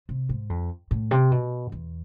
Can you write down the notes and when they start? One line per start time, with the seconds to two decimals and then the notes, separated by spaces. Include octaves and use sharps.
0.09 C3
0.29 G#2
0.50 F2
0.91 A2
1.11 C3
1.31 B2
1.72 E2